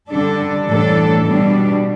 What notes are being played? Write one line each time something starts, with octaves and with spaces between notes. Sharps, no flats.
D3 G3 D4 A4
A2 E3 G3 D4 A4
B2 G3 D4